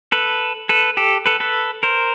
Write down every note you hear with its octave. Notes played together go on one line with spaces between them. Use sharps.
A4 B4
A4 B4
G4 A4
A4 B4
A4 B4
A#4 C5